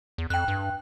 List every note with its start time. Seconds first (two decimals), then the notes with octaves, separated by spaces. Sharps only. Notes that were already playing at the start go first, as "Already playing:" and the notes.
0.18 E2
0.30 F2 G5 F#6
0.48 G2